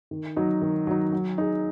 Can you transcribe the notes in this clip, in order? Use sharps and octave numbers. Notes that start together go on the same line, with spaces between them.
D#3
F#3 D#4
D#3
F#3 D#4
F#3
D#4 G#4